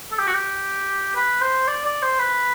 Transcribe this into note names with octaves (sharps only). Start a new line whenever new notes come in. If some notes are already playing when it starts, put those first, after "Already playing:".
A4
G4
F#4
G4
B4
C5
D5
D5
C5
B4